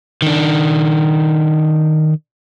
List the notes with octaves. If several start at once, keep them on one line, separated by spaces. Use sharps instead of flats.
D#3 D4